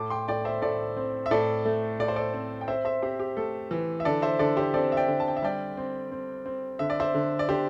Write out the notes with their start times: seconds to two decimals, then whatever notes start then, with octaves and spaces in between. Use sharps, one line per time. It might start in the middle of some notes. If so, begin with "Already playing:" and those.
Already playing: A2 A5 D6
0.10 G5 C6
0.28 A2 D5 G5
0.45 C5 E5
0.62 A2 A4 D5
0.97 C4
1.26 E5
1.31 A2 A4 D5
1.65 A3
2.00 A2 D5
2.08 C5
2.16 A4 D5
2.34 C4
2.61 G5
2.68 C4 C5 E5
2.85 C5 E5
3.02 C4 G4 C5
3.19 G4
3.37 A3 A4
3.71 E3
4.00 E5
4.05 D3 A4 D5
4.22 C5 E5
4.39 D3 A4 D5
4.57 G4 C5
4.74 C4 A4 D5
4.92 E5
4.97 D5 G5
5.08 D3
5.20 A5
5.28 G5
5.37 E5
5.42 G3 D5 G5
5.77 C4
6.11 C4
6.46 C4
6.79 D3 E5
6.90 D5
7.00 C5 E5
7.14 D3
7.39 D5
7.49 D3 G4 C5